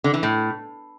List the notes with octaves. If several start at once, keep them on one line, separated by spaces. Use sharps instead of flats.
D3
E3
A2